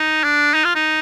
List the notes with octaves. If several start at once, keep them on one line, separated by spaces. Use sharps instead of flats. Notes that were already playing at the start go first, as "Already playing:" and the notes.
Already playing: D#4
D4
D#4
F4
D#4